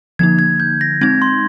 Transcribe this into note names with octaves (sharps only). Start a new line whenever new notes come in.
D3 F3 A#3 D#4 G#6
G#6
G6
A#6
G#3 C4 D#4 G#6
C6